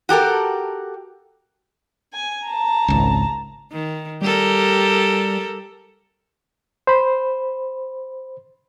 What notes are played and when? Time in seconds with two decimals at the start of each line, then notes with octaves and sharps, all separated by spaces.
0.09 F#4 G4 A4 A#4
2.13 G#5
2.48 A5 A#5
2.88 G#1 C#2
3.72 D#3
4.22 G3 G4 A4 A#4
6.87 C5 B5